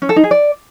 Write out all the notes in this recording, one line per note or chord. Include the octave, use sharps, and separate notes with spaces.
C#4
A4
D#4
G#4
D5